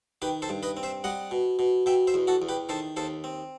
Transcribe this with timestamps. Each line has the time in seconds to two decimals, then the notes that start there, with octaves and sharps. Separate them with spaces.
0.22 D#3 G4 B4
0.42 A4 C5
0.49 G2
0.63 B4 D#5
0.77 C4
0.83 C5 E5
1.04 G3 D#5 F#5
1.31 B2
1.59 B2
1.86 B2 E5 G5
2.07 C5 E5
2.14 E2
2.27 F#4 A4
2.42 E2
2.49 G4 B4
2.69 D#3 A4 C5
2.97 D#2 A4 C5
3.24 C4